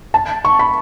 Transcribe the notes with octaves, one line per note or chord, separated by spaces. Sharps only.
A5
C#6
B5